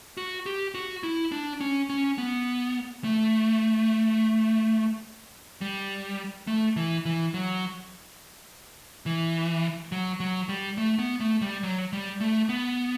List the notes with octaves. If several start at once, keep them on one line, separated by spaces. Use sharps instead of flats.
F#4
G4
F#4
E4
D4
C#4
C#4
B3
A3
G3
A3
E3
E3
F#3
E3
F#3
F#3
G3
A3
B3
A3
G3
F#3
G3
A3
B3